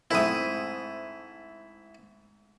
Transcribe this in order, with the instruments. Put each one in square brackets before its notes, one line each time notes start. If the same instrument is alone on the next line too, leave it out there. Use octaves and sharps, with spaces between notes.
[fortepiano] G#2 A3 C4 [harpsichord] E4 D#6